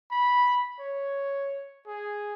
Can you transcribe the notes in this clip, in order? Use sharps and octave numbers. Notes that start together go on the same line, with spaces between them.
B5
C#5
G#4